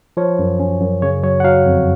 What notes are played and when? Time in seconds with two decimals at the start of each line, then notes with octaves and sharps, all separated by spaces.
0.17 F3 C#5
0.39 F#2
0.59 C#4
0.81 F#2
1.02 C#3 C#5
1.23 F#3 C#5
1.40 F#5
1.44 F#3 F5
1.66 F2